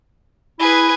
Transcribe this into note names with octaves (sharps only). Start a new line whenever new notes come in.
E4 G#4 B4